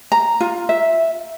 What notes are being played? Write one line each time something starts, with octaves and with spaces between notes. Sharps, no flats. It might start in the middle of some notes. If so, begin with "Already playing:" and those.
A#5
F4
E5